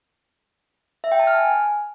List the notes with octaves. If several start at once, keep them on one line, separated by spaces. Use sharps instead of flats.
E5
G5
A5
F6
G#5